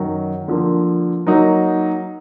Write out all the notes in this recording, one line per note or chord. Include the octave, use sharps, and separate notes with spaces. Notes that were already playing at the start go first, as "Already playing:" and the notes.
Already playing: F#2 D#3 F#3
D3 F3 A#3
F#3 A#3 D#4